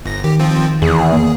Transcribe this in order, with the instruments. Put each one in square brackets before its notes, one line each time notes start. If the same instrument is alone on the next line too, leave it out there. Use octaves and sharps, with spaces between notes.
[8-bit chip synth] G1 A#6
[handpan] D#3 [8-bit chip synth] G4
[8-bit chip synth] F3 C4 F4
[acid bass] E2 [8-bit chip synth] G#4
[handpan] A#3